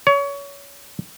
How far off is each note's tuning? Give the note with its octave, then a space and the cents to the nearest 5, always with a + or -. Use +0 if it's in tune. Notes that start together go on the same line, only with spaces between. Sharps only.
C#5 +25